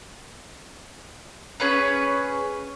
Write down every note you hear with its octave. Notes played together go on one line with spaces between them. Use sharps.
C#4 G#4 B4 C#5